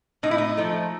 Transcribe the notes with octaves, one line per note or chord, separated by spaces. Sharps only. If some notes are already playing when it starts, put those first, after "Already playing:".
A2 D#4
E4
D#4
F3 A3